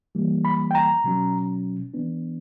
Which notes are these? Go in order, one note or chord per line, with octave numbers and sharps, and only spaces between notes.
E3 G3 A#3
B5
G5
A#5
B2 F#3 C#4
E3 B3 D4